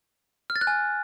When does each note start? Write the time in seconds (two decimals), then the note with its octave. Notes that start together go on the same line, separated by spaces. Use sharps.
0.50 F6
0.56 A6
0.61 F#6
0.67 G#5